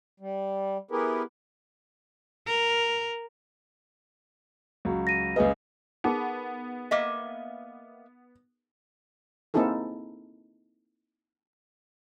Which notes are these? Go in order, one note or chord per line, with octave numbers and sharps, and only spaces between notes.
G3
B3 E4 G4 G#4 A#4 B4
A#4
C#2 F#3
A#6 D#7
C#2 G#4 B4 D#5
B3 D#4 G#4 A#4
A#3 D#5 E5
A#3 C4 D#4 E4 G#4 A4